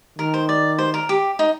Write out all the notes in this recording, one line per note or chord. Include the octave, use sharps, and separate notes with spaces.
D#3 A#4
C5
D5
C5
A#4
G4
D#4